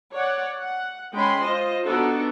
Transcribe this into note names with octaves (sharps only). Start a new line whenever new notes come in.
C#5 D5 F#5
F#5
G#3 C#4 G5 B5 C6
F4 C5 D#5
B3 D4 D#4 F#4 A4